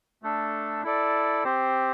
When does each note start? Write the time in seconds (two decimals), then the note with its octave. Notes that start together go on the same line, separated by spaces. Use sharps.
0.23 A3 D4 A4
0.84 E4 A4 D5
1.44 C4 G4 C5